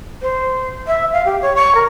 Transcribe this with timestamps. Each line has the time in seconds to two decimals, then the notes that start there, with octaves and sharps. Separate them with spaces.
0.21 C5
0.87 E5
1.12 F5
1.25 G4
1.41 C#5
1.55 C#6
1.75 A#4